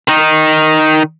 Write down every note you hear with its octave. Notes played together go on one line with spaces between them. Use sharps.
D#3 D#4